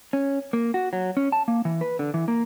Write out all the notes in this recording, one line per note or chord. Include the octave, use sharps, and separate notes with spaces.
C#4
A#3
F#4
F#3
C#4
A5
A#3
E3
B4
D3
E3
A#3